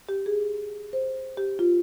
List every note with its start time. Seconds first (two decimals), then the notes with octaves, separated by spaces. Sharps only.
0.09 G4
0.26 G#4
0.93 C5
1.37 G4
1.59 F4